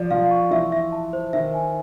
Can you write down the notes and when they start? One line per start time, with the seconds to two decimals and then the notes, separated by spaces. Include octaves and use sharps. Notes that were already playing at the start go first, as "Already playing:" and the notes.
Already playing: F3 D5
0.11 F3 F5
0.31 C#6
0.51 E3 E5
0.72 E5
0.92 A5
1.13 C5
1.33 D#3 E5
1.54 G#5